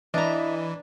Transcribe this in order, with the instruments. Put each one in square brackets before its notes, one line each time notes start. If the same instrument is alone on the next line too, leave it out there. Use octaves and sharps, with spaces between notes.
[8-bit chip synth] E3 [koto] D4 A#5 [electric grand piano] D#5 [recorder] E5